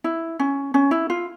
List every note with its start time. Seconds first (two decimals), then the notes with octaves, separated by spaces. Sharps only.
0.04 E4
0.39 C#4
0.74 C#4
0.91 E4
1.10 F4